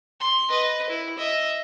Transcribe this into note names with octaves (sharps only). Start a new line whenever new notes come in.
C6
B4 D#5
E4
D#5 E5